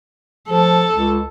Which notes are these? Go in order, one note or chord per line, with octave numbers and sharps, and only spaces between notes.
F3 A4
C#2